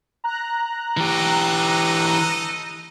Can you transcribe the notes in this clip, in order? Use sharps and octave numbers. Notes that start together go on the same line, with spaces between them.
A#5 F#6
E3 D#4 G4 A4 D#5